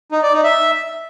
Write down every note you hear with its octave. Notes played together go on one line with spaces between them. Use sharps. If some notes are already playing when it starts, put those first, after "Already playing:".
D#4
D5
D#4
E5